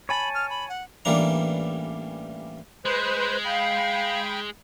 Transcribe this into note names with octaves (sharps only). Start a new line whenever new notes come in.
C#5 G#5 A5 B5
F6
B5
F#5
A1 E3 G3 A#3 D4 A#5
G#3 B4 C5
F5 G5 B5